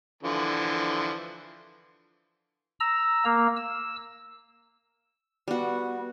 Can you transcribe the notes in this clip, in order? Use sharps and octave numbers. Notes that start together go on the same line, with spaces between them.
D3 E3 F3
A#5 E6
A#3
E6
G3 B3 F#4